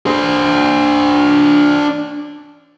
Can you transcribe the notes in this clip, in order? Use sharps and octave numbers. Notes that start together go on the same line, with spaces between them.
D4 C5